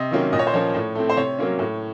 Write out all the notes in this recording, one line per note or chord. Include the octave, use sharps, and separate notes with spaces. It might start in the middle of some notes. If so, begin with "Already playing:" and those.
Already playing: C3 D#5
D#3 F#3 A#3 C#4
A#2 D#5
C#5
C5
F3 A#3 C#4 C#5
A2
A3 C4
C5
C3 C#5
F#3 A#3 C#4
A2